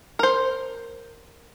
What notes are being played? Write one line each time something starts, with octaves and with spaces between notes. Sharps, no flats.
A#4 C5